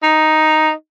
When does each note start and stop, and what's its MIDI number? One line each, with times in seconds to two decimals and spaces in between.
0.03 0.71 63